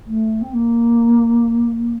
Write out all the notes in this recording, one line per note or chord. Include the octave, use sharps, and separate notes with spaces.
A3
C4
A#3